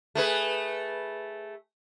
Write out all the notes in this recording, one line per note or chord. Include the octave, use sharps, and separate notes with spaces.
A3 G#4 B4